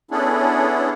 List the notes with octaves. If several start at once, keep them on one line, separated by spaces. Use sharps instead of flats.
B3 C#4 D4 E4 G#4 A4